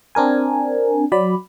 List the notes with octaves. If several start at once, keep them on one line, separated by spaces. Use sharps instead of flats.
C4 D4 A#4 G#5
F#3 D5 B5